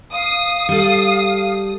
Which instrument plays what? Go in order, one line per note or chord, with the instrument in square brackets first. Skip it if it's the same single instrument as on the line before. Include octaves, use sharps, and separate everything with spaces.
[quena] F5 [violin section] D#6
[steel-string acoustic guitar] G3 A4